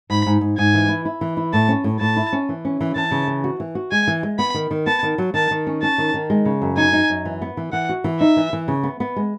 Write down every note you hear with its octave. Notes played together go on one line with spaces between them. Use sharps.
G#2 B5
G#2
G#2
G#2 G#5
E3
E4
E4
E3
E4
A2 A5
C#4
A2
A2 A5
E4
C#4
E3
C#4
E3
E3 A5
C#3
E3
F#4
E3
F#4
G#3 G#5
E3
G#3
B3 B5
D#3
D#3
B3 A5
D#3
F#3
D#3 A5
D#3
C#4
C#4 A5
D#3
D#3
G#3
C#3
F#2
D#4 G#5
D#4
F#2
E3
B3
E3
E3 F#5
F#4
E3
D#4 E5
E3
E3
C#3
B3
B3
G#3